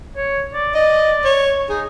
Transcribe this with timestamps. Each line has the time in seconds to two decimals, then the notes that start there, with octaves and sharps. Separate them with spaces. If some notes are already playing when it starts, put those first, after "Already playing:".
0.16 C#5
0.53 D5
0.75 D5 D#5
1.25 C#5
1.70 D#4 G#4